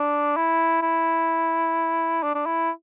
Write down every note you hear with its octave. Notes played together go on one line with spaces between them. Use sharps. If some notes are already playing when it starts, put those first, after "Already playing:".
Already playing: D4
E4
E4
D4
D4
E4